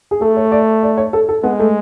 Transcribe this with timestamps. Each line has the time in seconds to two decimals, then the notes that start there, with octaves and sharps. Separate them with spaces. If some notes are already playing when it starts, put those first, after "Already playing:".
0.11 G#4
0.21 A3 A4
0.37 C#5
0.52 D5
0.83 D5
0.98 C#5
1.13 A4
1.29 A4
1.43 G#3 B3
1.59 A3